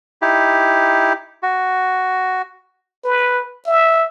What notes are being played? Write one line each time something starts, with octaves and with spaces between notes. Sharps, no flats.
D#4 E4 G4
F#4
B4
E5